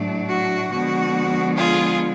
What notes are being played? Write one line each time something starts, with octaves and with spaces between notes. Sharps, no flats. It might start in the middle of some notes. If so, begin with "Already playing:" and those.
Already playing: A2 F#3 A3 D4
F#4
D3 F3 G#3 B3 F#4
F4 G#4